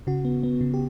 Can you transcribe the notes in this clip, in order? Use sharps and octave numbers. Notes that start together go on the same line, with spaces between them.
C#3 F#4
B3
B3
C#3
G4